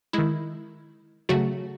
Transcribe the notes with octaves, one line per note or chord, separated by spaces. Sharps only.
D#3 G#3 E4
C#3 F#3 A3 F#4